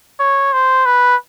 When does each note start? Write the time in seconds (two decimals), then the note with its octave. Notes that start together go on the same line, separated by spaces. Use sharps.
0.20 C#5
0.53 C5
0.86 B4